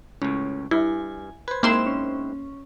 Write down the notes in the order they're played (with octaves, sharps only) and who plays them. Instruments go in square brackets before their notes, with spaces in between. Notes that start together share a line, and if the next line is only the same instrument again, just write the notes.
[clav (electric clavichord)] C#2 A2 [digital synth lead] C#4
[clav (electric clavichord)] G2 [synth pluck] E4 [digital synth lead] G#5
[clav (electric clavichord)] B4 C5 [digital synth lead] G#6
[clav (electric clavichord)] G#2 C4 E4 [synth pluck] A#3 C6 E7
[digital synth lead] C#4